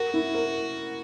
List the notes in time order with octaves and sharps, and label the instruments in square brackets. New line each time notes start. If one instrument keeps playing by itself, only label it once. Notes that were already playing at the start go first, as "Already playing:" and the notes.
Already playing: [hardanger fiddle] F#4 [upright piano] A#4
[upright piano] E4
A#4